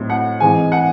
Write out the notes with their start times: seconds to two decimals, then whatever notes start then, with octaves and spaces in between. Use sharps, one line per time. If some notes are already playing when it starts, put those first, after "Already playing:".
Already playing: A2 F#3 C4 D#4
0.10 F#5
0.40 G#2 E3 C4 D#4 G#5
0.72 F#5